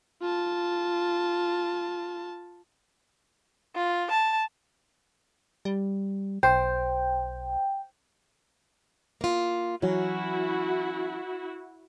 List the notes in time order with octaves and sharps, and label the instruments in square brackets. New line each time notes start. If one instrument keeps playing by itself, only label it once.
[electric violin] F4 A5
[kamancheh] F4
A5
[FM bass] G3
[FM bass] B1 [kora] C5 [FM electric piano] G5
[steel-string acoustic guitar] A#3 F4
[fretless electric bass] E3 F#3 [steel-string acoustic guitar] C#4 [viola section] E4 F#4